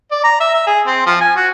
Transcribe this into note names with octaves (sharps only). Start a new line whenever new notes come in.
D5
A#5
E5
E5
G#4
C4
F3
G#5
F#4